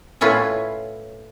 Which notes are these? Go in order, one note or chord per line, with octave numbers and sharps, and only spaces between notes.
A2 C#4 E4 F4 B4